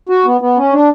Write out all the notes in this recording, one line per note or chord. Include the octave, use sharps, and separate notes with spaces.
F#4
B3
B3
C#4
D4